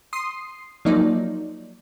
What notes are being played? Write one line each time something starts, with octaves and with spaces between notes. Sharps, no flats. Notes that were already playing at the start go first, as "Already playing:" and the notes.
C6 D#6 C7
F3 F#3 A#3 D#4 D5